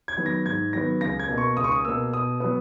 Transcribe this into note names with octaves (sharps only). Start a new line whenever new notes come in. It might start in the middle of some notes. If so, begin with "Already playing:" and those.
G#6
D#3 F#3 B3
A#6
G#2 G#6
D#3 F#3 B3 A#6
C#2 A#6
G#6
B2 A#3
C#6
C#2 D#6
C#6
D#6
B2 A#3 E6
B2 D#6
F#3 B3 D#6